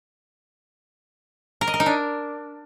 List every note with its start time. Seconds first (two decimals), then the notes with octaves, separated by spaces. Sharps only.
1.61 A#4
1.67 D#5
1.74 A#4
1.80 D#4
1.86 D4